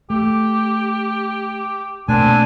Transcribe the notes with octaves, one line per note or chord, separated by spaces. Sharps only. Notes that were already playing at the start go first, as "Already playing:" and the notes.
A3 G4
B2 A3 A#3 C4 D4 G#5